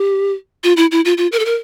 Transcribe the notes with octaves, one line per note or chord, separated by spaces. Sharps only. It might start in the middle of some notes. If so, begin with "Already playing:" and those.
Already playing: G4
F4
E4
E4
F4
F4
A#4
A4
A#4